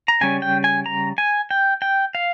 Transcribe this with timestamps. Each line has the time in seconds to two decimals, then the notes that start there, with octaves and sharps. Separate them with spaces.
0.08 A#5
0.21 C#3 G3 C#4 G#5
0.42 G5
0.64 G#5
0.86 A#5
1.18 G#5
1.51 G5
1.82 G5
2.15 F5